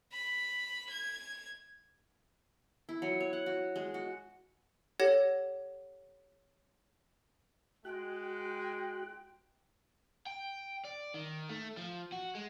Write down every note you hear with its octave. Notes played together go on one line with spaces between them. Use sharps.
B5
G#6
E4
F#3
C#5
F#5
F#4
G#3
F#4
G4 A4 C#5 F#5 G#6 A#6
G#3 F#4 G5 F#6
G5
D5
D#3
A3
F3
F#4
G#3